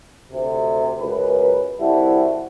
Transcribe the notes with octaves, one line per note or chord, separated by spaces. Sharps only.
D2 C3
C#2 F#2 B4
C2 G3 C4 E4 F#4 A4